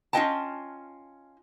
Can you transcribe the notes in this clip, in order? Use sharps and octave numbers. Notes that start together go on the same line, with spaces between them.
C#4 F4 A#4 D#5 G5 A5